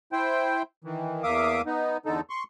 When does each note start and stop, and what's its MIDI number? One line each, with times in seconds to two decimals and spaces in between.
0.12 0.62 64
0.12 0.62 72
0.12 0.62 79
0.84 1.23 51
0.84 1.23 52
1.23 1.62 40
1.23 1.62 58
1.23 1.62 76
1.23 1.62 77
1.23 1.62 86
1.23 1.62 87
1.66 1.97 59
1.66 1.97 63
2.06 2.21 40
2.06 2.21 50
2.06 2.21 63
2.06 2.21 69
2.30 2.43 84
2.30 2.43 85